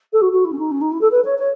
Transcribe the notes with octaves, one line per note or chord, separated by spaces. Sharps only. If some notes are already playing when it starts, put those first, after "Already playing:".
A4
F#4
F#4
E4
C#4
D#4
C#4
D#4
E4
A4
B4
C#5
C#5